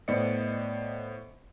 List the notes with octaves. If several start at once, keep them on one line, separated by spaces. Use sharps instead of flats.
A2 B3 C5 D5 D#5 C#7